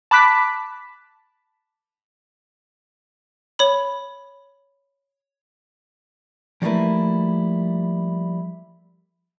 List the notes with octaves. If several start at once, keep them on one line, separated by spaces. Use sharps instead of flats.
A5 B5 D6 F#6 B6
C#5 B5
F3 G3 A3 A#3 E4 B4